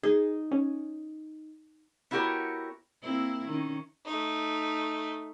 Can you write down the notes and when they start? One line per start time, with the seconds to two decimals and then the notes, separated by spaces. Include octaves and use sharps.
0.03 D#4 G#4
0.51 C#4
2.11 B3 E4 F#4 G4 A#4 C#5
3.02 A#3 C4 E4
3.46 D#3 C#4
4.05 A3 D#4